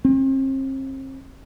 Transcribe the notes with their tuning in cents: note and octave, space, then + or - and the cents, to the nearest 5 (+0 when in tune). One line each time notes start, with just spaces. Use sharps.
C4 +40